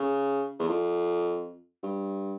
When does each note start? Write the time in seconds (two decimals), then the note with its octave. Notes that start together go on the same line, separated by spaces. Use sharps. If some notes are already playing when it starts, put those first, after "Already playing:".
Already playing: C#3
0.59 E2
0.69 F2
1.83 G2